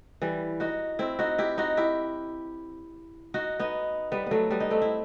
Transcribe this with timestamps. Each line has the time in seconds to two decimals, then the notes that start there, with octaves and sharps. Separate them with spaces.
0.22 E3 G3
0.60 D#4 F#4
0.99 C4 E4
1.19 D#4 F#4
1.38 E4 G4
1.58 D#4 F#4
1.77 E4 G4
3.34 D#4 F#4
3.60 B3 D#4
4.12 G3 B3
4.26 F#3 A3 B3
4.51 G3 B3
4.60 D#4
4.70 A3 C4
4.82 E4